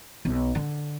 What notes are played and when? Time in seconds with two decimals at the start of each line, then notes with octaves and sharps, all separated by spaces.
0.25 B1
0.55 D3